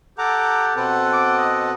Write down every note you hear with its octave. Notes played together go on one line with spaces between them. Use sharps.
G4 A4 F#5 A#5 D6
B2 C4 A4 B4 F#5
D6
D#5